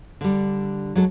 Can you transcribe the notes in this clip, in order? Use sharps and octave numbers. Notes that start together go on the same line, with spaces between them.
D3 G3
F#3 G#3 A4